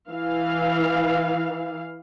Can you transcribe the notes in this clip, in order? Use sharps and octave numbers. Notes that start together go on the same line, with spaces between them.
E3 F5